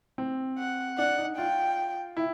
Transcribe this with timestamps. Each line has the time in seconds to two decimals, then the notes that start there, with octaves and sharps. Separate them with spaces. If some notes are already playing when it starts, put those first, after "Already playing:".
0.18 C4
0.58 F#5
0.98 D4 F#5
1.18 D#4
1.37 F4 G5
2.17 E4